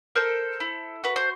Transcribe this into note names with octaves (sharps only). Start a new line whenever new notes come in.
A4 A#4 C5
E4
F#4 B4
C5